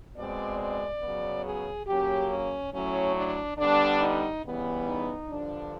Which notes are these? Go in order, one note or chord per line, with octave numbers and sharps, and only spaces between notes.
B2 G#3 C4 D5
D5
C#3 F#3 B3
G#4
C#3 F#3 A#3 C#4 G4
C#4
A2 F#3 A3 C#4
D4
D3 G3 B3 D4
D#4
C#3 E3 G3 B3
D#4
G2 D3 F3 D4